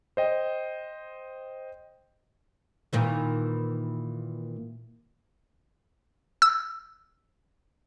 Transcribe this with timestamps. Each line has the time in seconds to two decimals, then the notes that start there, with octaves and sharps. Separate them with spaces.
0.17 C5 D#5 G5
2.93 A#2 D#3 E3
6.42 E6